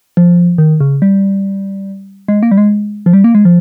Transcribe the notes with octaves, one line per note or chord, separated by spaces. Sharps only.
F3
D#3
C#3
G3
G#3
A#3
G3
G#3
F3
G3
A#3
G#3
F3